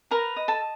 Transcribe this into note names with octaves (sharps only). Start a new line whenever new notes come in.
A#4 B4 A#5
D#5
A4 A5